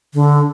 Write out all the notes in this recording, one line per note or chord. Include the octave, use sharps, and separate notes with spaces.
D3